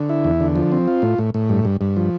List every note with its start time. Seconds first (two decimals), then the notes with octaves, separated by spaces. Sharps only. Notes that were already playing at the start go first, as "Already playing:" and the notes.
Already playing: D3
0.09 E4
0.24 E2
0.40 D3
0.56 F3
0.72 C4
0.87 F4
1.02 A2
1.18 A2
1.34 A2
1.49 G2
1.65 G2
1.81 G2
1.96 F3